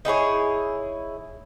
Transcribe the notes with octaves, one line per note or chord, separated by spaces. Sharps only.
D#4 E4 G#4 C#5